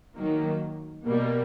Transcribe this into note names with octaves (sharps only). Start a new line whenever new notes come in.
D#3 F#3 A#3
B2 G3 A#3